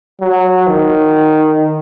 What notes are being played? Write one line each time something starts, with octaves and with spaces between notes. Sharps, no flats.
F#3
D#3